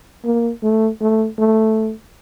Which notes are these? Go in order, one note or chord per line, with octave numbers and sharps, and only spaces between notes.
A#3
A3
A3
A3